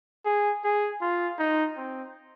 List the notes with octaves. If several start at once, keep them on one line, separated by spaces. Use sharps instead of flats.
G#4
G#4
F4
D#4
C4